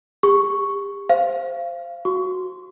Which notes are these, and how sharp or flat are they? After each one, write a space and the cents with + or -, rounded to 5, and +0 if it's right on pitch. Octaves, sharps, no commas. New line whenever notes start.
G4 +40 C#6 +0
C5 +0 F5 -25
F#4 +0 C#6 +20